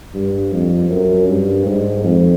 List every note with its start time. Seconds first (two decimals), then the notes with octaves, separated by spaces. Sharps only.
0.14 G2
0.52 F2
0.90 F#2
1.28 G2
1.66 G#2
2.04 F2